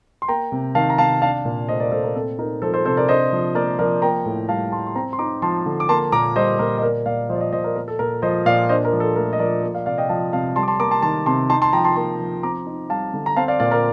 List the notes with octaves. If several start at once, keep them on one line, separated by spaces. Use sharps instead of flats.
C6
A#3 G5 A#5
C3
D#3 F5 A5
A#5
C3 F5 A5
D4 F5 A5
A#2
A3 C5 D#5
A#4 D5
A#2 A4 C5
A#4
C4 A4
D#4 A#4
F3 A4 C5
A4 C5
C3 A4 C5
A#4 D5
D4 C5 D#5
F3
A#3 A#4 D5
F3 A#4 D5
A#3 G5 A#5
A2
G3 F5 A5
A2 A5 C6
C6
C4 G5 A#5
C6
D#4 A#5 D6
F3 A5 C6
D3
D6
A#3 A5 C6
A#2 A#5 D6
G3 C5 D#5
A#2 A#4
D#5
A#3 A#4 D5
A#2 D5 F5
F3 C5 D#5
D5
C5 D#5
A#2 C5 D#5
A#4 D5
A#3 A#4
A4
A#2 A#4
F3 C5 D#5
A#2 D5 F5
D4 C5 D#5
A#4
F3
A4
A3 A#4
D#5
F3 A#4 D5
A#3
D5 F5
C3 D5 F5
D#5 G5
F3 F5 A5
C3 F5 A5
G3 A5 C6
D6
A5 C6
A#3 A#5 D6
A5 C6
D#3 A5 C6
C3 A5 C6
D#4 A5 C6
A5 C6
F3 G5 A#5
A5 C6
A#3 A5 C6
F3
C4 A#5 D6
D#4
G3 F5 A5
D3
A#5
C4 F5 A5
D5 F5
A#2 D5 F5
A#4 D5